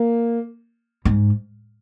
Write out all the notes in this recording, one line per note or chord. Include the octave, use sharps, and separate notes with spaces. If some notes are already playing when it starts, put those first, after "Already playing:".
Already playing: A#3
G#2